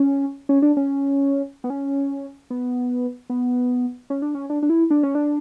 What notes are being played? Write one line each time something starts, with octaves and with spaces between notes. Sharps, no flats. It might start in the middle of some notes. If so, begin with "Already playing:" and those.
Already playing: C#4
C#4
D4
C#4
B3
C#4
B3
B3
C#4
D4
C#4
D4
D4
E4
D4
C#4
D4